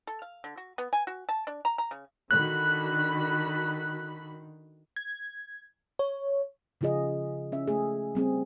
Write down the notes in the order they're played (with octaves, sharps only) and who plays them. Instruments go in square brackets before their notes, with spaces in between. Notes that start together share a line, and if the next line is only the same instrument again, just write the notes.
[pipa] A4
F5
D3
F#4
B3
G#5
F#4
A5
D4
A#5
A#5
C#3
[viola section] D3 F#4 B5 [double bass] D#3 [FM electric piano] F#6
[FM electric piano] G#6
C#5
[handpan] C#3 F3 F4 G#4 D#5
C#4 E5
A3 G#4
G3 C4 G#4